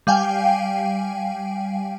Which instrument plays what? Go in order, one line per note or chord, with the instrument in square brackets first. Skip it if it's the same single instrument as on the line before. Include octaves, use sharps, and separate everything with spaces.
[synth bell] G3 F5 G5 G#5